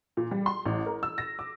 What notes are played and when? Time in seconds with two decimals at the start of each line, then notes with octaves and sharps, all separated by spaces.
0.17 A#2
0.31 G3
0.46 C6
0.66 A1
0.86 A#4
1.03 E6
1.18 A#6
1.39 D6